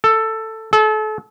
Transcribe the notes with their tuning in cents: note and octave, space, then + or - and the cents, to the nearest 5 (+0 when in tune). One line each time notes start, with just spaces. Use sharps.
A4 +10
A4 -35